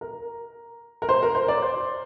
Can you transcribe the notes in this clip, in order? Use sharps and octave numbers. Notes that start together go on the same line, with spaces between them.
A#4
A#4
C5
A#4
C5
D5
C5